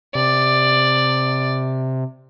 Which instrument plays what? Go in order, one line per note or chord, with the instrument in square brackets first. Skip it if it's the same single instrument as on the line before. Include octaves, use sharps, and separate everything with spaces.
[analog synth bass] C3 [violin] D5